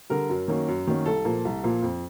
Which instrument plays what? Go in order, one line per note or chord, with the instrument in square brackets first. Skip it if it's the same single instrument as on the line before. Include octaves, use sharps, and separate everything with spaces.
[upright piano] D3 G3 A#4
F#2
D#3 F#3 A#3 C#4
F#2
D#3 F#3 A#3 C#4
C2 A4
A#2 F3 A#3
C2
A#2 F3 A#3
F2